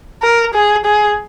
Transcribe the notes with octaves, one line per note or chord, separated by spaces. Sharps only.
A#4
G#4
G#4